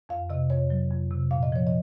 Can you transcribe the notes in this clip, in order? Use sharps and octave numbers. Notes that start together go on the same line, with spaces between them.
F2 F5
C3 D#5
F2 C#5
F#3
F2
C3
A#2 F5
D#5
F3 C#5
D#5